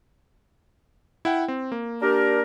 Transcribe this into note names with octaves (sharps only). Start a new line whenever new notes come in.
E4 F#5 G5
C4
A#3
D4 G4 A#4